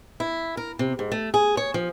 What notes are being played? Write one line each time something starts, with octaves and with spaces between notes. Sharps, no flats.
E4
A#4
C3
G#2
A3
G#4
C#5
F3